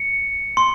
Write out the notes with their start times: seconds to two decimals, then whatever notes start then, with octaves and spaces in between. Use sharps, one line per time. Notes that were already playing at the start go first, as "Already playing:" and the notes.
Already playing: C#7
0.57 C6